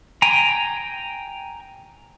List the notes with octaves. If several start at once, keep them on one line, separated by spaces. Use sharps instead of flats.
G5 G#5 A#5